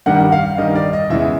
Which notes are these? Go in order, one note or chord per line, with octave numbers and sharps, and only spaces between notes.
G2 D#3 G3 F#5
F#5
F5
G2 D#3 G3 D#5
D5
D#5
E2 C#3 E3 G#3 E5